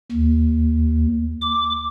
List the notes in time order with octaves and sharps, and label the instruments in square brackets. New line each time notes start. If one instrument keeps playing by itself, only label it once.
[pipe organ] D#2
D6